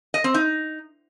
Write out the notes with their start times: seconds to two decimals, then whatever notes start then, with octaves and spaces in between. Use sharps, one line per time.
0.14 D#5
0.24 C4
0.34 D#4